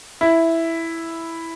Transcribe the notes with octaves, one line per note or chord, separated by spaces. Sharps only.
E4